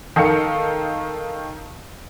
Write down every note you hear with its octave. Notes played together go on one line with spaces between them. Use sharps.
D#3 A4 D#5 F5 C#7